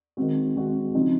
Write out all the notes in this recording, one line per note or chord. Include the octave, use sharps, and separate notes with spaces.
D#3 G#3 C4 F#4
D#3 G#3 C4 F#4
C#3 F3 C4 D#4